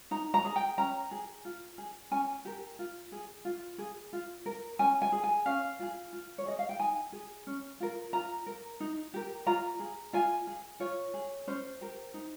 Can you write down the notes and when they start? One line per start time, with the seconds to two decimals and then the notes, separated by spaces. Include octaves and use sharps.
0.11 D#4 A#5
0.34 A#5
0.45 G#4
0.56 G5
0.78 C#4 A#5
1.11 G#4
1.45 F4
1.78 G#4
2.11 C#4 G#5
2.45 G4 A#4
2.79 F4
3.12 G#4
3.45 F4
3.78 G#4
4.13 F4
4.46 A#4
4.79 C#4 G#5
5.02 G#5
5.12 G#4
5.24 G#5
5.46 C#4 F5
5.79 F4 G#4
6.13 F4
6.38 C#5
6.46 G#4 D#5
6.59 F5
6.69 G5
6.79 D#4 G#5
7.13 G#4
7.47 C#4
7.80 F4 A#4
8.13 F4 A#5
8.46 A#4
8.80 D#4
9.14 G4 A#4
9.46 F4 A#5
9.80 G#4
10.13 F4 G#5
10.47 G#4
10.80 F4 C#5
11.14 G#4
11.47 C#4 C5
11.81 G4 A#4
12.14 D#4